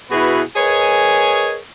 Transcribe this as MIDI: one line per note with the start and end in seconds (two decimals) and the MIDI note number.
0.11 0.41 47
0.11 0.41 64
0.11 0.41 66
0.11 0.41 68
0.11 0.41 71
0.56 1.56 68
0.56 1.56 70
0.56 1.56 71
0.56 1.56 73
0.56 1.56 75
0.56 1.56 80